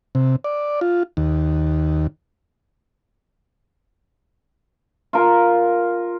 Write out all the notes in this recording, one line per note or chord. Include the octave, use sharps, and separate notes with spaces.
C3
D5
F4
D#2
F4 A#4